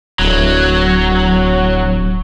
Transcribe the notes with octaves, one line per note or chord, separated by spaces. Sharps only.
D1 F#3